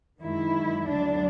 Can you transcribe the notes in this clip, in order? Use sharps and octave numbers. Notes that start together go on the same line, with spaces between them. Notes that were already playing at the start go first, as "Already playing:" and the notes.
F#2 D#3 G#3 E4
D2 D3 F#3 D4